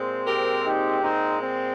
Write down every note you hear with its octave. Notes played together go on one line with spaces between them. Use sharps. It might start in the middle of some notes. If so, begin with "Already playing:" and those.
Already playing: A#2 G#3 C4
G4 A#4
D#4 G4
C4 D#4
C4